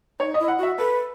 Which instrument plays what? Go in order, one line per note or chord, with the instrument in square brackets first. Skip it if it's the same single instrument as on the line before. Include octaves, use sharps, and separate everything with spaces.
[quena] D#4 [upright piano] C#5
[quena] E4 [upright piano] D#5
[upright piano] F#5
[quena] F#4 [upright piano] E5
[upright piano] A4 [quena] B4